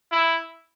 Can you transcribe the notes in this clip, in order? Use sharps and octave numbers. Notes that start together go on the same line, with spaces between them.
E4